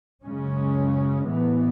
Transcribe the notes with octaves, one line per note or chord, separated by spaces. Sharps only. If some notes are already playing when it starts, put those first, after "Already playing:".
F#2 C#3 G#3 C#4
A2 E3 B3